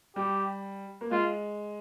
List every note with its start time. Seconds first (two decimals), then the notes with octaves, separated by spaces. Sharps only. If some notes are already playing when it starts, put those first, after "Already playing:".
0.16 G3 G4
1.01 A#3
1.11 G#3 F4